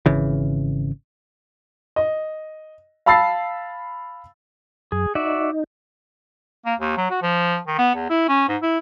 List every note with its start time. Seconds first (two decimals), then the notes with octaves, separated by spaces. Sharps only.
0.06 G#1 C#3 E3
1.96 D#5
3.06 F5 A5 B5 E6 A6 C7
4.92 F#2 G#4
5.15 D#4 F#4 D5 E5
6.66 A#3
6.80 D#2
6.97 F#3
7.10 F#4
7.22 F3
7.67 D#3
7.79 B3
7.95 E2
8.10 E4
8.29 C#4
8.48 G#2
8.62 E4